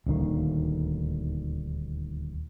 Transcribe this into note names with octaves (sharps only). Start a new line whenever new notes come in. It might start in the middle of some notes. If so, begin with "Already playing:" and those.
D#1 D2 D#3 A#3